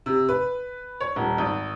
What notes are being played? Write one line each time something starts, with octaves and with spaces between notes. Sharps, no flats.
C3
B4
C#5
D#1
G#1